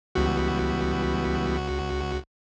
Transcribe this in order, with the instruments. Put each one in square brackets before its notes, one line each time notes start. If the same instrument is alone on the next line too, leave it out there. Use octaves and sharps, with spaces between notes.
[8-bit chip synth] C#2 F#4 [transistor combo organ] E3 G3 B3